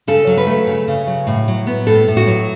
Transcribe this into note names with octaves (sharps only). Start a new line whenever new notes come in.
C#3 A4
F#3
B4
A3
C#3
C#3
F#3
A2
F#3
B3
A2 A4
A2
F#4
F#3